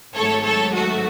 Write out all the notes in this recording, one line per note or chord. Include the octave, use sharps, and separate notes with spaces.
G#1 G#2 F#3 A3 A4 C#5
A4 C#5
F#4 A4